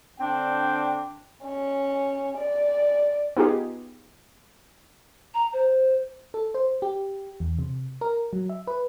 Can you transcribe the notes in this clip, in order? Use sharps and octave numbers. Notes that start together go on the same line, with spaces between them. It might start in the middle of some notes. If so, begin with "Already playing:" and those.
D3 C4 D4 G5
C#4
D5
B3 D#4 F4 G4 G#4
A#5
C5
A4
C5
G4
E2
C3
A#4
F#3
E5
B4